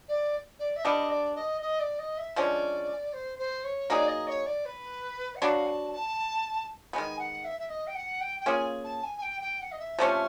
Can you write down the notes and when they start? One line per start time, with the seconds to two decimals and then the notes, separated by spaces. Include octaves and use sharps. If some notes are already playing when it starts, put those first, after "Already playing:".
0.08 D5
0.59 D5
0.76 E5
0.84 G3 B3 D4 D#5
1.10 D5
1.35 D#5
1.61 D#5
1.80 D5
1.99 D#5
2.18 E5
2.36 D3 F3 G#3 C#4 D5
3.13 C5
3.39 C5
3.64 C#5
3.90 F#3 A#3 D#4 G#4 D5
4.08 D#5
4.27 C#5
4.46 D5
4.65 B4
5.36 F#5
5.41 F#3 B3 D4 F#4 F5
5.67 A5
5.92 A5
6.93 D#3 G#3 B3 G#5
7.19 F#5
7.45 E5
7.59 E5
7.69 D#5
7.87 G5
7.95 F#5
8.21 G5
8.40 G5
8.46 A#3 C#4 F4 G#4 G#5
8.84 A5
9.03 G#5
9.17 G#5
9.22 G5
9.41 G5
9.61 F#5
9.72 D#5
9.79 E5
9.99 C3 F3 A3 C#4